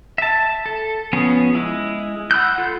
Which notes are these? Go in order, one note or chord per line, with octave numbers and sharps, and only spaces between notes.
E5 A5
A4
F3 B3 C#4 G#4
G#3 E4
F#5 B5 E6 F#6 G6
F4 A4